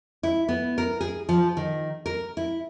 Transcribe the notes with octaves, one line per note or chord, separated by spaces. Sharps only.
E4
B3
A#4
G#4
F3
D#3
A#4
E4